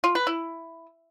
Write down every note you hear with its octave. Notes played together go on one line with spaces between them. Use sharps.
F4
B4
E4